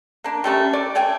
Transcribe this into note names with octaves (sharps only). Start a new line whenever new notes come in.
A#3 D4
G3 A3 C#4 E5
D5
A3 C#5 G5 G#5